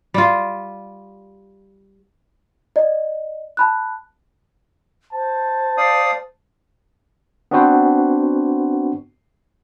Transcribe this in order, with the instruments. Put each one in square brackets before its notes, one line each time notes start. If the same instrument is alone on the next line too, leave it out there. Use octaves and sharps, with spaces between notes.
[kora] G3 F4
[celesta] D5 D#5
A5 B5 F#6
[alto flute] C5 [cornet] A5
[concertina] D5 F5 D#6
[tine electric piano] B3 C4 D4 F#4 B4 C5